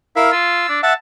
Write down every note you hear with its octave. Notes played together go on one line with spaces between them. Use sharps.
E4 A#4 E5 F5
F4 E6
D4
E5 F#5 A5